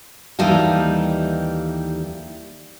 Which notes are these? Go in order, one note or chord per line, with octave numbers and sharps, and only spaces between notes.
D#2 E3 G3 D#4 A4 F5